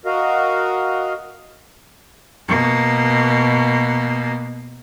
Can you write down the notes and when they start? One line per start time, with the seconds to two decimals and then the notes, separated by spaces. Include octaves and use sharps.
0.06 F#4 A#4 D#5 F5
2.48 B2 A#3